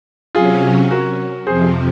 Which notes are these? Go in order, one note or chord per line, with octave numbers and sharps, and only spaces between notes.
C3 F#3 C#4 F4 G#4
F#4 A#4
F2 C3 F3 G#4 C5